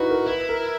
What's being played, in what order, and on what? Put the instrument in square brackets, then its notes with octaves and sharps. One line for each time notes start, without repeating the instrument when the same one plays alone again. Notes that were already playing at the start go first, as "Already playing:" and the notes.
Already playing: [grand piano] D#4 E4 B4 [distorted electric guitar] F#4
[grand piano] A#4
[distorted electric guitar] E4 [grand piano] B4
[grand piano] A#4